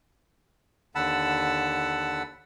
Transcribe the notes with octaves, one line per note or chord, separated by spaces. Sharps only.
D#2 D3 F#5 A5 B5 E6